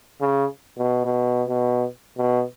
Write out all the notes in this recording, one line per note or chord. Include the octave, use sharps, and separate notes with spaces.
C#3
B2
B2
B2
B2